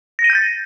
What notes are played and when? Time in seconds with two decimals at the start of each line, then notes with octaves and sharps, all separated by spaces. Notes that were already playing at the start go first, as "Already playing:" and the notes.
0.19 A#6
0.24 D#7
0.30 G6
0.35 A6